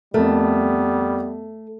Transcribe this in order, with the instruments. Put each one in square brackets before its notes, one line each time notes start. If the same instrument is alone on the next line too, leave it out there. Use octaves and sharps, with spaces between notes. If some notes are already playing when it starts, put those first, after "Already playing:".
[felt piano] F2 A#4 [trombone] G3 [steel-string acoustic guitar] A3 [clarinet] B3